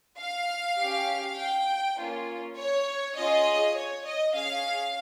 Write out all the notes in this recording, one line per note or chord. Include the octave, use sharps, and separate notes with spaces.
F5
C#4 G4
G5
A#3 C#4 F4
C#5
C#4 F4 G#4 D#5
C#5
D#5
C#4 G#4 F5